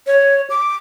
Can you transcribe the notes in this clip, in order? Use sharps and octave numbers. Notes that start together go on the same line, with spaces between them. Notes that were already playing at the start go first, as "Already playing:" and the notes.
C#5
D6